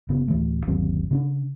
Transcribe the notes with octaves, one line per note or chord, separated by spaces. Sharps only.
F#1 C#3 B3
D1 E3 A3
G1 D#2 F#3 C4
C#3 C#4 D4